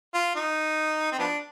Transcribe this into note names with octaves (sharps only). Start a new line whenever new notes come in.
F4
D#4
C4
F3 B3 D4